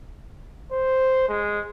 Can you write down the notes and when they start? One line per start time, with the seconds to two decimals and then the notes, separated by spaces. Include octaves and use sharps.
0.72 C5
1.29 G#3